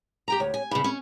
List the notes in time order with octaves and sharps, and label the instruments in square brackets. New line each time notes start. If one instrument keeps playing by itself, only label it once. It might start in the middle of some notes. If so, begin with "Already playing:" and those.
[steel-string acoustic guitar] G4 G5 A#5
[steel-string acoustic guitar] D2 [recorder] C#5
[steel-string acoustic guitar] G#5
[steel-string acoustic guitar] G2 C#3 [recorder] B5
[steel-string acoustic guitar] C#4